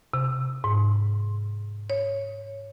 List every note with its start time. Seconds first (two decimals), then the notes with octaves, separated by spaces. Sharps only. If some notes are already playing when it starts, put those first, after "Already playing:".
0.14 C3
0.64 G#2
1.90 C#5